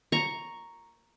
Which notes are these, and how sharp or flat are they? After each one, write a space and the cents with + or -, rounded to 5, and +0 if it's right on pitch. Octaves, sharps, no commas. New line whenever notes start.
A#5 +0 C#6 +0